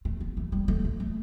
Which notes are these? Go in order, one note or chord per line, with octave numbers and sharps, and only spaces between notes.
A3
B3
A3
G3
A3
A3
A3